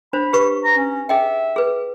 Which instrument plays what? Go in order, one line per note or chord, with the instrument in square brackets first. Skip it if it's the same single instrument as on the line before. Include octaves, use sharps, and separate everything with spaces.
[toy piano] D4 C5 [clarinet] B5
[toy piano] G4 B4 C#6
[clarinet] A#5
C#4
[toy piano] G#4 D#5 G5 [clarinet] E5
[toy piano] G#4 B4